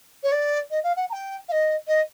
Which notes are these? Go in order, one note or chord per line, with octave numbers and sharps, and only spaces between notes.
C#5
D5
D#5
F5
F#5
A#5
G5
F5
D#5
D#5